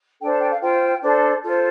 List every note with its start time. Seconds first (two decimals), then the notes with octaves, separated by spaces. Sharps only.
0.20 D4 A4 C5 G5
0.30 A5
0.40 G5
0.50 F5
0.60 F4 C5 G5
1.02 D4 A4 C5
1.43 F4 A4 C5